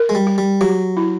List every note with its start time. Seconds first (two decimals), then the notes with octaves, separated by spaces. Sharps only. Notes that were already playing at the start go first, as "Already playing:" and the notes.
Already playing: A#4
0.09 G#3
0.15 G3
0.27 G4
0.38 G3
0.61 F#3 G4
0.97 E4